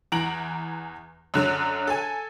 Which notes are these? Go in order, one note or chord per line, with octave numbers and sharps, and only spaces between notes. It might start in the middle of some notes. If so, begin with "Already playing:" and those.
E2 E3 A#5 D7 F#7
F#2 D3 F#3
A4 G#5